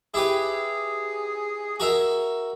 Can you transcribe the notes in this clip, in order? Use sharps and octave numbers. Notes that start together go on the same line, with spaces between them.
E4 G4 G#4 B4
F#4 A#4 E5